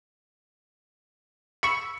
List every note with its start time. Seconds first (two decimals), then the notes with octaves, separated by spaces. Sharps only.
1.63 B5 C#6 E6 C#7